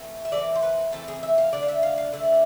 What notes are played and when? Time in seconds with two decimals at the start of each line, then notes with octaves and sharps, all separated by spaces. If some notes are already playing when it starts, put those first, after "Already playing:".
Already playing: E3 A3 C4
0.25 E5
0.32 E3 A3 C4 D5
0.55 C5
0.62 B4
0.92 E3 A3 C4 A4
1.08 G#4
1.23 E5
1.38 F5
1.53 D3 A3 D4 D5
1.63 F5
1.68 E5
1.83 F5
1.98 F5
2.13 D3 A3 D4 E5